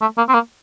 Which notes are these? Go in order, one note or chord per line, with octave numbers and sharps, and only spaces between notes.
A3
A#3
C4
A#3